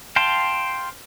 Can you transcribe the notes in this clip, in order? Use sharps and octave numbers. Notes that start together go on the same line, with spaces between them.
F5 G5 A5 C6